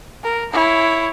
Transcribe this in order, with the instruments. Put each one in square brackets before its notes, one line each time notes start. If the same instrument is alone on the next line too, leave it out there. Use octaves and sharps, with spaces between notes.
[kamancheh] A#4
E4 C#5